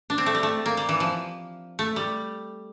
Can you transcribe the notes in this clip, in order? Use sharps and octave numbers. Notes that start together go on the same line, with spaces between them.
D4
C4
A3
G3
A3
A#3
G3
E3
F3
A3
G3